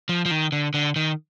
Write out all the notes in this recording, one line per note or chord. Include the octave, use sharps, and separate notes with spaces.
F3
F3
D#3
D3
D3
D#3